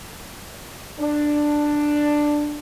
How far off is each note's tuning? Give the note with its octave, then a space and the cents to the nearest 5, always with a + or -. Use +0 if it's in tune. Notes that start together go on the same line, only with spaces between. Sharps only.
D4 +10